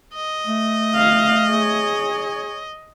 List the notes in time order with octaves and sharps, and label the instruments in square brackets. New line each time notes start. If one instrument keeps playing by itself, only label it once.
[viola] D#5
[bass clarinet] A3
[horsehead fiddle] F5
G#4 C#5